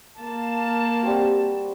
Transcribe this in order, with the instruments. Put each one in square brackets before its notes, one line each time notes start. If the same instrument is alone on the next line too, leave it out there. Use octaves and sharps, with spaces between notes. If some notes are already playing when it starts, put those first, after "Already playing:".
[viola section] A#3 A5
[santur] G3 C4 F#4